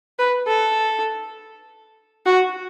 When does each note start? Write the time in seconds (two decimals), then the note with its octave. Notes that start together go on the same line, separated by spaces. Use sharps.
0.19 B4
0.48 A4
2.26 F#4